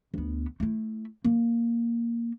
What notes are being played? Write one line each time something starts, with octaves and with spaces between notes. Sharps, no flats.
D2 B3
A3 E4
A#3